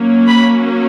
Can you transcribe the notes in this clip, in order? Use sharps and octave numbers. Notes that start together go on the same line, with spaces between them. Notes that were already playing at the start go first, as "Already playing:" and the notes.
Already playing: F#3 A#3 C#4
B5